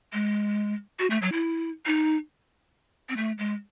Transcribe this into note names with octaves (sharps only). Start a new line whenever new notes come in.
G#3
F#4
A3
F#3
E4
D#4
C4
A3
G#3